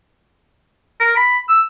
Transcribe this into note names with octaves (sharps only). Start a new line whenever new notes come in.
A#4
B5
E6